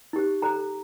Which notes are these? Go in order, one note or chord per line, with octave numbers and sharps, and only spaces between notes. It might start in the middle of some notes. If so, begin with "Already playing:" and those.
D#4 G4 C5
D#4 A4 C5 A#5